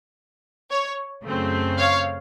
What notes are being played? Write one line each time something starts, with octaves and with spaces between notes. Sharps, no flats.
C#5
F#2 C#3 A3 C4
C#5 F5